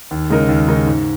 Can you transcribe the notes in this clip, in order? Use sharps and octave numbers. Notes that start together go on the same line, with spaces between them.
D#2
C#3 G#3 D#4 A#4
D#2
C#3 G#3 D#4 A#4
G#2